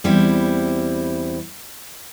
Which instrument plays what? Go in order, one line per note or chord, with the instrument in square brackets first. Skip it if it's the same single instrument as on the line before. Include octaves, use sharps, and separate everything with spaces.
[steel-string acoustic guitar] E2 G3 C4 E4